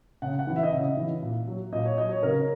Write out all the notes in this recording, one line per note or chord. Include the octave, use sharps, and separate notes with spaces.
C#3 F#5
F#5
E3
E5
D#5
C#3 E5
E3
A#2
F#3
A#2 D#5
C#5
F#3 D#5
C#5
C#3 A#4